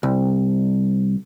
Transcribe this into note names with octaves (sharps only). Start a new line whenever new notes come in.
C2